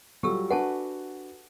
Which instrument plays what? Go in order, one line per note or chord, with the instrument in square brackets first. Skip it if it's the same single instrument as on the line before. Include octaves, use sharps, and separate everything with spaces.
[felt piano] F#3 G3 F4 [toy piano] G4 A4 E6
[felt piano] D4 F#4 B4 [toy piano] F#5 G#5 A5